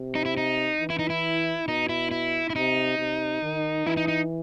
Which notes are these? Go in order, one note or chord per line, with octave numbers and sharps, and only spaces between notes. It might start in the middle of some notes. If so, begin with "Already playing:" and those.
Already playing: C3
D#4
E4
D#4
E3
E4
D#4
E4
B2 D#4
E4
E4
E4
C3 D#4
C3
D#3
E3 E4
D#4
D#4